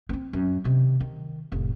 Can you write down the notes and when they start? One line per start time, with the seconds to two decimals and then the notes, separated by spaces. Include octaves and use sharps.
0.09 B3 C4
0.33 F#2
0.64 C3 D#3
1.00 D#3
1.52 F1 A2